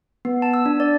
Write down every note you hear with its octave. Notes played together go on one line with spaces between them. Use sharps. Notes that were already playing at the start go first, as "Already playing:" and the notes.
B3
A5
E6
D4
D5